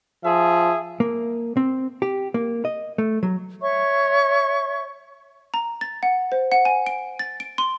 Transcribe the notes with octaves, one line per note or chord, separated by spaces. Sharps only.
F3 G#4 E5
A#3
C4
G4
A#3
D#5
A3
F#3
C#5 E5 C#6
A#5
A6
F#5
C5
F#5
G#5
D7
A6
D7
C6